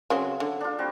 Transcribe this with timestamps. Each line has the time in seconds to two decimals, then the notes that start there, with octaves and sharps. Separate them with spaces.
0.10 C#3 F#3 C4
0.40 D3
0.61 D4 F4
0.78 G3 C4 F#4